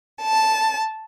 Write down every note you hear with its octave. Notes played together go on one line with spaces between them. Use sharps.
A5